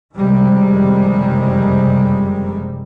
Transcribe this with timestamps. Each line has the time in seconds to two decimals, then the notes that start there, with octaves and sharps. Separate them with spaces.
0.16 F#1 F2 C3 D#3 G3 G#3